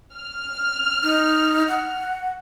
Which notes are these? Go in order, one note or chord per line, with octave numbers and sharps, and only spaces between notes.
F6
D#4
F#5